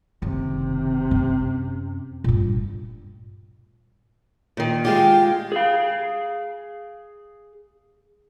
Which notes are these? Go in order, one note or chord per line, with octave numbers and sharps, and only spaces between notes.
F#1 C3 D#3
F#2 C#4
G2 A#2
A#2 D#3
G#3 F4 G4 G5
G#4 F5